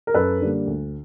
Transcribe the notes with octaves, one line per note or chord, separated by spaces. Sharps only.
A#4
F#2 A4 B4
D3 G3 A#3
D2